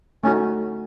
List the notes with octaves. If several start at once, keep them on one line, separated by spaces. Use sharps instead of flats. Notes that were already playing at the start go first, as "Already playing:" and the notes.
A3 C#4 D#4 F#4